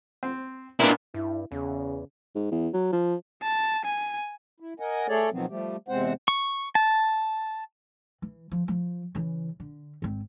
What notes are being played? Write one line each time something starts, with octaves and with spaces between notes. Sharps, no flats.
C4
A#2 A#3 B3 D4 E4
G2 E4
E2 C#3
G#2
E2
F#3
F3
A5
G#5
E4
A#4 D#5 F#5 G#5
A3 G#4 A4 C#5 D5
B2 D#3 F3 F#3 B3 C4
F3 G3 A3 G4
E2 C3 G#3 C4 C5 F#5
C#6
A5
E3
F3
F3
C#3 E3
D3
G#1 C4